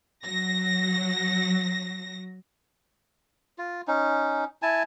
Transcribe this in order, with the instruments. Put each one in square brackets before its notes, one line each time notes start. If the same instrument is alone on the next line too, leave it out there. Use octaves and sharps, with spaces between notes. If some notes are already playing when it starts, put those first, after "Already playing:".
[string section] F#3 A#6
[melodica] F4
C#4 D#4
E4 G#5 A5